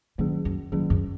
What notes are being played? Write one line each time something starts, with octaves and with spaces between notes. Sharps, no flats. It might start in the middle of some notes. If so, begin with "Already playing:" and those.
A#2 D#3 F#3 A#3 C#4 G#4
F#2
G#2 D#3 F#3 A#3 C#4 G#4
F#2